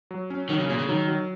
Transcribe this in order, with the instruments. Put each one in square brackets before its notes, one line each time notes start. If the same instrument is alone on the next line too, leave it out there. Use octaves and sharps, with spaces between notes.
[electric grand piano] F#3
C#4
[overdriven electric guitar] D#3 [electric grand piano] F#3
[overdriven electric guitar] C#3
[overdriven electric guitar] A#2 [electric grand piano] G#4
[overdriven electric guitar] C#3
[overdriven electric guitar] D#3 [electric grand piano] F#3
[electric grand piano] F#3